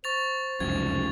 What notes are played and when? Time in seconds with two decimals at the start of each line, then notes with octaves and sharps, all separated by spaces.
0.04 C5 C#6 A6 F7
0.60 F1 C#2 F#2 G#6